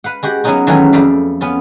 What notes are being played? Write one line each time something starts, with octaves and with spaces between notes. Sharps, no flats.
B4 F5 F#5
G#3 F#4 G4 F#5
F#3 A#3 B3 C#4 D#4 F#4
D#3 E3 F#3 G#3 A3 C#4
F2 A3 D5 F5 B5
B3 C#4 F4